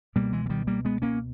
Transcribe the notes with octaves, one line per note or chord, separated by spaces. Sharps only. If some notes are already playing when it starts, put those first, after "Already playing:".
C#2 B2 G3 A#3
E3 G#3
E3
D#3 G3
G3 A#3
G#3 B3
A#3 C#4